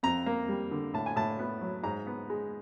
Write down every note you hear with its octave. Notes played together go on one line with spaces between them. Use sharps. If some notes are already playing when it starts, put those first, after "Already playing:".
F2 A#5
A#3
G3
D3
A2 A5
G#5
A2 A5
B3
F#3
G#2 A#5
B3
G#3